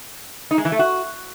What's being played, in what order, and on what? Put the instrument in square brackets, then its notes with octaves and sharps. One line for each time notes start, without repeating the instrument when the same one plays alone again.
[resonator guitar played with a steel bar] D#4
G#3
E3
A3
F#4